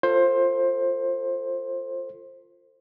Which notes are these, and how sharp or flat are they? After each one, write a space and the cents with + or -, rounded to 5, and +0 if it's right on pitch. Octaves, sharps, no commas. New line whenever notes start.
F4 +0 A4 +40 C5 +20